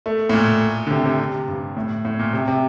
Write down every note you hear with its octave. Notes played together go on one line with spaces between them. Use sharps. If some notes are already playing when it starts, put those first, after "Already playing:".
A3
A2
A#2
D3
C3
C3
C3
G2
A2
A2
A#2
C3
C3